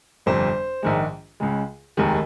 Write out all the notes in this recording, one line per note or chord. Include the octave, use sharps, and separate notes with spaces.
G1 F2 C3 C5
A#1 G#2 D#3 G#3
C#2 C#3 G#3
F1 D#2 D#3 G#3